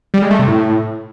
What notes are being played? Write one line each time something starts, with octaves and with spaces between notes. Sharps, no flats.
G3
G#3
A3
C3
A2